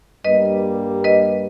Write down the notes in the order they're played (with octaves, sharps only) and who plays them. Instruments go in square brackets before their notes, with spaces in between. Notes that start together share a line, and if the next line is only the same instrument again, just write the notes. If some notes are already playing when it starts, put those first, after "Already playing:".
[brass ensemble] G2 G3 A#3 [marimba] B4 D#5
[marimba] B4 D#5